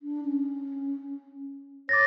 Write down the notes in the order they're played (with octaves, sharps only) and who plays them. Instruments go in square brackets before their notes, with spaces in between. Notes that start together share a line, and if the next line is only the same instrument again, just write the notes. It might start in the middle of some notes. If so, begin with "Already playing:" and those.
[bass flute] D4
C#4
[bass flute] C#5 [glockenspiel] D6 A6 A#6